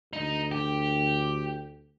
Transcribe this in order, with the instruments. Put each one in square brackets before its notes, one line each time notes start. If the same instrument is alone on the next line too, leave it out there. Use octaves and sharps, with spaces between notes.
[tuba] D2 [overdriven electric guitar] D#4
[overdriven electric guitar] G4